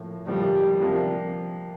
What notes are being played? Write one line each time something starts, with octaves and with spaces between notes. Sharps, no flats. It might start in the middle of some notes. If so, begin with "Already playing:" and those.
Already playing: A2 F3 A#3
A2 F3 G3 A#3
C3 F3 A#3 D4 G4